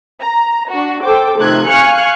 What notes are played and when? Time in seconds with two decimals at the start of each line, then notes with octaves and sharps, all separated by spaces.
0.21 A#5
0.69 D4 F#4
1.02 A4 C5 G5 D6
1.38 C3 D#3 F3 A3 F#6 G#6
1.68 F5 G#5 C#6 F6 F#6 C#7